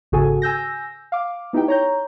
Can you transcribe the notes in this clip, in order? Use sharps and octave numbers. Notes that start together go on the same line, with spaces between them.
G#1 C#3 F#4 G#4 A4 G#5
G#5 E6 G6 A#6
F5 D6
B3 D#4 E4 G4 G5
C#5 A#5 G6